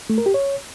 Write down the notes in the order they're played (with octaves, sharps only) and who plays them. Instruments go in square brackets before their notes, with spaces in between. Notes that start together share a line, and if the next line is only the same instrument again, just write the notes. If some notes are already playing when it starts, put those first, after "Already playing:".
[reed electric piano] A3
A#4
G4
C#5